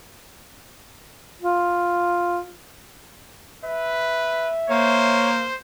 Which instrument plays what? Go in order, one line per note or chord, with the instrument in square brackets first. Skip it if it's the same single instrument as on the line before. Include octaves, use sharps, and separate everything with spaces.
[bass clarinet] F4
[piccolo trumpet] B4 [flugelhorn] E5
[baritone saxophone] A#3 [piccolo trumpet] C5 [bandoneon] C#5